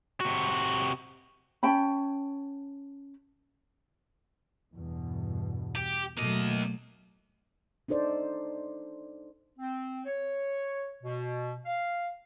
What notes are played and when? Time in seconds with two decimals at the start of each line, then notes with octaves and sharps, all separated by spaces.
0.20 C3 F#4
1.63 C#4 G5 A5 B5
4.75 E2 G2 B2
5.76 G4
6.18 B2 F#3 A3 A#3 D#5
7.88 D4 D#4 A4 C5 D5
9.59 C4
10.06 C#5
11.03 B2
11.66 F5